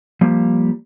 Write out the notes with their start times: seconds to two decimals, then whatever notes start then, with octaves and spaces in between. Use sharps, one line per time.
0.21 F3 G3 A#3